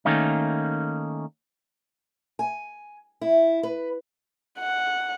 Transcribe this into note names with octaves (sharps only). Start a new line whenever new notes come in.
D#3 A3 A#3 C#4 D#4
G#5
E4
B4
F#5